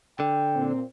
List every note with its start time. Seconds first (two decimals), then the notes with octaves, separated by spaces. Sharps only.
0.20 D3 G5
0.55 A#2 C4